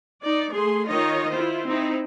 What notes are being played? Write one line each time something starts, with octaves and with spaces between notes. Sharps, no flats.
D#4 D5
A3 G#4 C6
D#3 D#4 F4 C#5 D#5
E4 F4 C5
C4 D#4 E4